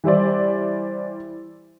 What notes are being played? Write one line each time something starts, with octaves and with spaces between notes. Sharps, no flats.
E3 G3 E4 C5 D5